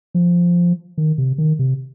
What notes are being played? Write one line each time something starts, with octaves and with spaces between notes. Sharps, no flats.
F3
D#3
C3
D#3
C3